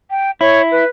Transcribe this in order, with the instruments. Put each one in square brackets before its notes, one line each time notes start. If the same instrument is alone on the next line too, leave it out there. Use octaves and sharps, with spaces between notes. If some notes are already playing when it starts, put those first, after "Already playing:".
[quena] G5
[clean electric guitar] E4 [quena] C#5
[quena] B4